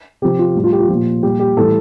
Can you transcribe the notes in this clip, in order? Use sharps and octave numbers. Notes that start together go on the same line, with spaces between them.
C3 F3 G4
F4
A2 G3
F4
G4
F4
A#2 F3
A#2 G3 G4
G4
A2 E3 G3 A4